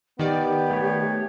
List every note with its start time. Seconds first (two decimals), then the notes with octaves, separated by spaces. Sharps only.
0.19 D#3 B3 G4 D5
0.71 A3 C#5